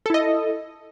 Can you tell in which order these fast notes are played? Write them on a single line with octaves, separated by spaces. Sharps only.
A4 E4 D#5